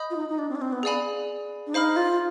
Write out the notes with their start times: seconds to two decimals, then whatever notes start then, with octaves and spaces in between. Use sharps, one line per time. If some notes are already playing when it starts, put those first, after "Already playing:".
Already playing: D#5 B5 D#6 G6
0.10 F4
0.16 D#4
0.29 D#4
0.38 D4
0.49 C4
0.55 D4
0.61 C4
0.72 B3
0.83 G#4 D5 F5 G#5 B5
1.67 D4
1.73 D#4 C5 F5 B5 F6
1.96 F4